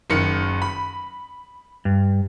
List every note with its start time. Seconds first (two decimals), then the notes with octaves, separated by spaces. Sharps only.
0.10 F#1 D#3 C#7
0.62 B5
1.85 G2